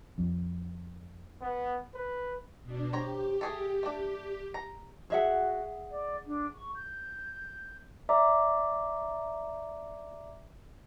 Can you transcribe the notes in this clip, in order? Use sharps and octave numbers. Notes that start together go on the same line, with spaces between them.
F2
B3
B4
B2 D4
G4 C5 C#5 A#5
A3 G#4 A4
A3 D4
A#5
F#4 G#4 E5 F#5
D5
D4
C#6
G6
D5 E5 A#5 D6